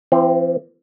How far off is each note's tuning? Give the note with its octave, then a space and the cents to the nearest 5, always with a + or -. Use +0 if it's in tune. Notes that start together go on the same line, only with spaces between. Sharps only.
E3 +45 C4 +0